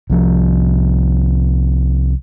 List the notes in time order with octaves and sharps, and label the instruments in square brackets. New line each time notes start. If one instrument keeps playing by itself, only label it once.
[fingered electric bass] C2 F3